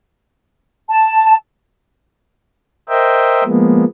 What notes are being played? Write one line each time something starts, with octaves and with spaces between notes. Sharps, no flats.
A5
A#4 C5 D#5 E5 G5
F3 G#3 A#3 B3